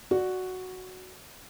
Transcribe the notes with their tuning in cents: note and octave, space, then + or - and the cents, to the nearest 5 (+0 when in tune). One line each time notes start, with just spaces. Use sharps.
F#4 +0 D5 +0